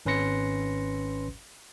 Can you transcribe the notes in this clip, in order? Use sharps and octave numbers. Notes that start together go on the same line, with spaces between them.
G#1 C#4 B4 C6 A#6 C#7